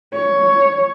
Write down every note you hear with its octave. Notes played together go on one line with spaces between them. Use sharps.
C#5